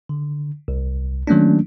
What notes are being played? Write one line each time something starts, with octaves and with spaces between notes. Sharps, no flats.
D3
C2
D#3 F#3 A3 A#3 C#4 D4